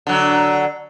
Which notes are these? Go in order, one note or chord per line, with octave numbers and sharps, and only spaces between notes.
D3 F#3